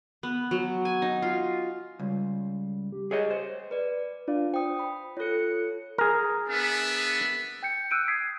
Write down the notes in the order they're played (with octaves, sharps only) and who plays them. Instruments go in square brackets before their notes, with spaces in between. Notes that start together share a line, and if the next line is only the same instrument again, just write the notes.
[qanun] B3
F#3
G#5
D#4
F4
[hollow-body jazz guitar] C#2 [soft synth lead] G3
[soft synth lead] G4
[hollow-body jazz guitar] G#4 C#5 D#5
C5
[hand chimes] B4 D5
[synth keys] D4 D5 F5 [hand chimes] F4
[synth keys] C5 [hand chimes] G5 D#6
[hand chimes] B5
[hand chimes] F4 A4 [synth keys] C#5 F#6 C#7
[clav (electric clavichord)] G#4 A#4
[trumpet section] B3 D4 E5
[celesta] G5 G6 C#7
E6 F#6 G6 D7 D#7
D#6 G#6 B6 C7 D7